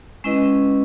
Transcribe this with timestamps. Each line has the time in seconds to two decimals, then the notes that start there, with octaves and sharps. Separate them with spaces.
0.24 G#3 C#4 E4 B4 D#5